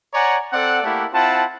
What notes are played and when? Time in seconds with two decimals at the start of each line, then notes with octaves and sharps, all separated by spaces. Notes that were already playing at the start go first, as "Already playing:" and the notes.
0.14 C#5 D5 F#5 G#5 A#5
0.53 C4 A4 D5 F#5
0.83 A3 A#3 E4 G4 A4 F#5
1.13 C4 E4 F4 F#5 A5